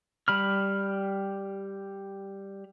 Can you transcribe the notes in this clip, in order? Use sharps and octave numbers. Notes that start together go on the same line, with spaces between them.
G3 B5 F6